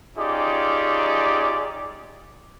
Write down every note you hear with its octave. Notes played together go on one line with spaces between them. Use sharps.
C#4 D#4 F4 G4 G#4 D5